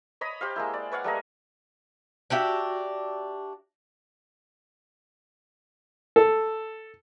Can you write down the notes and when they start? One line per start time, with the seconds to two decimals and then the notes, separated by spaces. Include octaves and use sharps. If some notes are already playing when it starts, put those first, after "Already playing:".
0.21 C#5 D#5 B5 D#6
0.41 G4 C5 F5
0.56 G#3 A#3 E4
0.74 D5
0.92 B4 C#5 F5 F#5
1.04 G3 A3 A#3 D#5
2.30 D4 F#4 G4 E5
6.16 A4